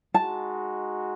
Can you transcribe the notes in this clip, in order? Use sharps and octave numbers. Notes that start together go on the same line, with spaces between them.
G#3 D#4 F#4 A5